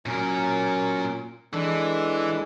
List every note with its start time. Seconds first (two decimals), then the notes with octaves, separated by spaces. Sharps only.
0.06 A#2 F#3 C#4 A#4
1.53 E3 G#3 D4 A4